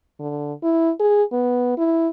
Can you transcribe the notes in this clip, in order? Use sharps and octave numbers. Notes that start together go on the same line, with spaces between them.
D3
E4
G#4
B3
E4